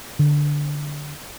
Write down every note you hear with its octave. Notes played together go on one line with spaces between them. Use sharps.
D3